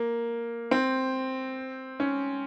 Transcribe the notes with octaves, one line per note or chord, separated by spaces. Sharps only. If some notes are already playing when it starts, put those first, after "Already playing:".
Already playing: A#3
C4
C#4